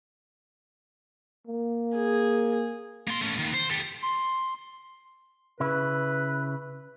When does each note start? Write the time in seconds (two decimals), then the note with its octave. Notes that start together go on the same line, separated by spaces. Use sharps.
1.47 A#3
1.96 G#4
3.07 A#3 C6
3.22 A3 C#4
3.38 D#3 A#3
3.54 C5
3.70 G4 A4
4.03 C6
5.60 C#3 E4 B4